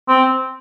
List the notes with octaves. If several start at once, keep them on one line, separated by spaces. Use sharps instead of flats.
C4